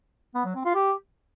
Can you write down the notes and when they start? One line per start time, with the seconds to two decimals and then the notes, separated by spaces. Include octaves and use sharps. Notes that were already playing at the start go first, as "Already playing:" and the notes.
0.35 B3
0.45 F#3
0.55 C4
0.65 F4
0.75 G4